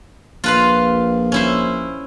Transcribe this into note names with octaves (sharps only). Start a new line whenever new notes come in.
A#1 F4 B4 F5
C#4 E4 C5